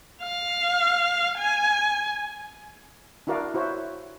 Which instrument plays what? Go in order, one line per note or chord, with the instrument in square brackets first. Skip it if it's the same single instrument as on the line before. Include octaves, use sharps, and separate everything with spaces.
[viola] F5
G#5
[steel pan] D4 E4 F#4 A#4 D5 F5
E4 F#4 C5 C#5 E5